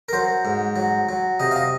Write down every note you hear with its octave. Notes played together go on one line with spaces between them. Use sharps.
A#4
F#3 C5
G#2
F#3
F#3
C3 D#5
F5
D#5